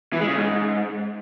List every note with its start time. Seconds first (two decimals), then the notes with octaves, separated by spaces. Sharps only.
0.13 E3
0.20 G#3
0.28 C#3
0.35 G#2